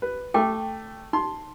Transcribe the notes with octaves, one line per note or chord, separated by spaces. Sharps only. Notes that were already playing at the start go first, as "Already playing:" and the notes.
B4
A3 G5 D6
D#4 C6